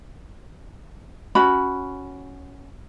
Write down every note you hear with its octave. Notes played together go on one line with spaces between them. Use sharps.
C#4 F#4 B5